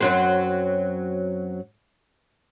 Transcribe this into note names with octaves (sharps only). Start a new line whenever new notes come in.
F#2 F#3 C4